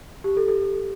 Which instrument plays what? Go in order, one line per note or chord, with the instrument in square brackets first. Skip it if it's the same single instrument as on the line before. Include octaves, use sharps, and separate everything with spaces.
[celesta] G4
A4
A4